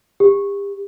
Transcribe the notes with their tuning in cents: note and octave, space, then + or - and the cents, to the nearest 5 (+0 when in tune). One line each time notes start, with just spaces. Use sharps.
G4 +35